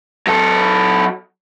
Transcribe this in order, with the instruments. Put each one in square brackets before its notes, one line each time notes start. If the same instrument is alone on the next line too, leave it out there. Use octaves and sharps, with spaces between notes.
[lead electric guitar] F#3 A4